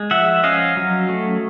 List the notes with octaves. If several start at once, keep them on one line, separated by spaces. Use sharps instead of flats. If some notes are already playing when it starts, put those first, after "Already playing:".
Already playing: G#3
F3 E5 F#5
C#4 D#5 F5
F#3
A3